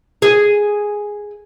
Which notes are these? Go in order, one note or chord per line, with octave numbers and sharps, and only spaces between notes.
G#4